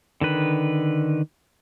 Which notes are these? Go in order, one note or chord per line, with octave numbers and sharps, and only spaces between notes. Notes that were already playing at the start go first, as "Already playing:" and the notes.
D3 D#3 B4